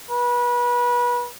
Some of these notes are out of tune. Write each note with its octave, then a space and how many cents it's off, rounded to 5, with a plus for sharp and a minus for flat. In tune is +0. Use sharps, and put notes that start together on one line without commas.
B4 -30